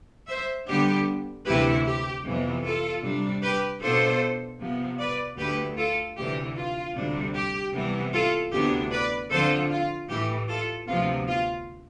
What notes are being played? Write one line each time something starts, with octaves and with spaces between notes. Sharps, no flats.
C5 E5
D3 G3 B3 D4 G4
D2 C3 E3 A3 E4 G4 B4
G4
F2 C3 E3 B3
F4 A4
C3 G3 D4
G4 B4
B2 B3 D4 F4 A4 C5
C3 F3 B3
B4 D5
D2 D3 A3 G4 B4
F4 A4
D2 C3 E3 G4
F4
D2 C3 G3 D4
G4
C3 E3 G3 B3
F4 A4
D2 C3 E3 B3 D4 G4
B4 D5
D3 F3 C4 F4 A4 C5
F4
A2 E3 A3 G4
F4 A4
D2 C3 F3 B3 F4
F4